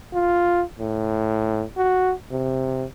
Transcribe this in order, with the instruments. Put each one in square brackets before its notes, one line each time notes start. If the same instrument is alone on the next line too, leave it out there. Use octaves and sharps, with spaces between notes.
[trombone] F4
A2
F#4
C3